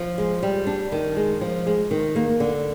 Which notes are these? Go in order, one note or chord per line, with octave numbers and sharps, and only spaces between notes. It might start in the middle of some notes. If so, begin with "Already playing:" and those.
Already playing: F3
G#3
G3
D4
D#3
G#3
F3
G#3
D#3
A#3
D3